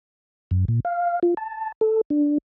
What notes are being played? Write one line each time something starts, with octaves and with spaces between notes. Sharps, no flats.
F#2
A#2
F5
F4
A5
A4
D4